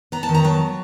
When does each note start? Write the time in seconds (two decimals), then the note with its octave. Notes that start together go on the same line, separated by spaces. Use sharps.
0.12 B3 A#5
0.23 A5
0.29 D#3
0.34 A#5
0.44 F#3 A5